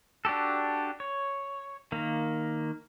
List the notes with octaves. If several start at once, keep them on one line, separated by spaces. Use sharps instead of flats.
D4 F#4 G4 A4
C#5
D#3 A#3